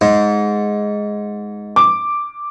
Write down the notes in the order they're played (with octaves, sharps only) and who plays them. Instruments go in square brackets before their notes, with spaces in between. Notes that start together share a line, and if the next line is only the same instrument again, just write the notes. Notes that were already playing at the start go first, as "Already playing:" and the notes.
[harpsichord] G#2
[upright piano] D6